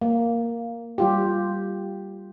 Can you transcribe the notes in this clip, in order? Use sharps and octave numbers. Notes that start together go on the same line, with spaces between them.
A#3
G3 F4 G4